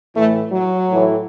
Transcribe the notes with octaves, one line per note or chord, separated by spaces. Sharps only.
A2 E3 A3
F#3
A2 E3